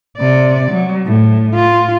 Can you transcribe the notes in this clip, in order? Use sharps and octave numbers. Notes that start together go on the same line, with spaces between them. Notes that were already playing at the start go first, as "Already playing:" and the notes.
C3 D5
F#3
A2
F4